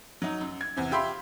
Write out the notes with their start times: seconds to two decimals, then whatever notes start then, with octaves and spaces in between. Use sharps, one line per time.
0.22 F#3 D#4
0.41 F#2
0.61 G#6
0.76 E2 C3
0.91 F4 G4 E5 B5 C6